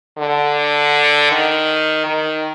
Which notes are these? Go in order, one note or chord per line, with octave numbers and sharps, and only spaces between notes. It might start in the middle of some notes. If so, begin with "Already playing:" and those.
D3
D#3
D#3